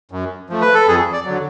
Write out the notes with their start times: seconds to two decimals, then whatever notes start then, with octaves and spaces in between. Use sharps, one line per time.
0.12 F#2
0.50 F3 A3
0.62 B4
0.74 A4
0.88 F2 G#4
1.13 D5
1.25 D3 F#3